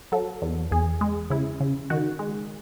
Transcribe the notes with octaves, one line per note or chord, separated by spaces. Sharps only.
F#3 A4
E2
E2 G#4
G#3
C#3 E4
C#3
D#3 F#4
G#3